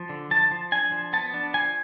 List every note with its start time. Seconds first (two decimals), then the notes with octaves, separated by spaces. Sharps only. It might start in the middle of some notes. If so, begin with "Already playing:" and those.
Already playing: F3
0.09 D3
0.31 F3 A5
0.51 F3
0.72 D4 G#5
0.92 F3
1.13 B3 A5
1.34 D4
1.54 F3 G#5